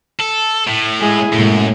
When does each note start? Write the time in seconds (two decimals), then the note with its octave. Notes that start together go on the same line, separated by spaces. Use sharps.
0.19 A4
0.67 A2
1.01 G#3 E4 G#4
1.33 F#2 A2 C3 G#3 A#3